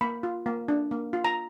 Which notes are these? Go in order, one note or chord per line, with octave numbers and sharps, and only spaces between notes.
A#3 B5
F4
A#3
D4
A#3
F4
A#5